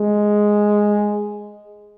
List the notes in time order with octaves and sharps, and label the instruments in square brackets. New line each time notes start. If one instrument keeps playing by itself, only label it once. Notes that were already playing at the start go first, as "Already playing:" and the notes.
Already playing: [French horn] G#3